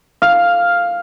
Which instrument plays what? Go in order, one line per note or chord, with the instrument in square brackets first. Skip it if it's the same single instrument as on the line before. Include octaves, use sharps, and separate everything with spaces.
[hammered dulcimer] F5